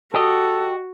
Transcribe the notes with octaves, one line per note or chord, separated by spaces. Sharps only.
F#4 G4 A4 D#5